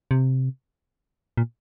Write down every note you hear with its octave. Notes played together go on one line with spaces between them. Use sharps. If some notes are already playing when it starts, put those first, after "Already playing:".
C3
A#2